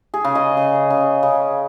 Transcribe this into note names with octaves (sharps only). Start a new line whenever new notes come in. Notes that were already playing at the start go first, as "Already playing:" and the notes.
G#4
C#3
D#5
C#3
C#3
C#3